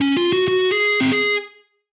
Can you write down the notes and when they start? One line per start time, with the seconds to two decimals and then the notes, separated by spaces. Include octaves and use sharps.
0.01 C#4
0.17 F4
0.33 F#4
0.48 F#4
0.72 G#4
1.01 C4